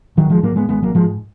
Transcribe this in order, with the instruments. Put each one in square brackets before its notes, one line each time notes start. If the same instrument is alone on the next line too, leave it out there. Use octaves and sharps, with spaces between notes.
[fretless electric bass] G#1 D#3 F#3
F3 G#3
G#2 F#3 A#3
G#3 B3
G#1 G#3 B3
F#3 A#3
G#2 F3 G#3